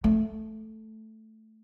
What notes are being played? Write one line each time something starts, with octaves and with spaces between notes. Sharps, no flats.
A3